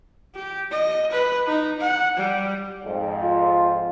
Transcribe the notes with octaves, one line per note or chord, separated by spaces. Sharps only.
G4
D#5
B4
D#4
F#5
G3
F2 G#2
F4